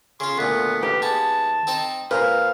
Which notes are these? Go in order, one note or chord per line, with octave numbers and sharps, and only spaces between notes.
C#3 F4 C6
D2 A#2 B3
D#2 G4 B4 F5
G#3 B3 A5
C4 D#4 C5
A#2 B4 C5 F5 A#5